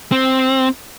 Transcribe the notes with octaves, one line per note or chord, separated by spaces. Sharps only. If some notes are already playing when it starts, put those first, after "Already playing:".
C4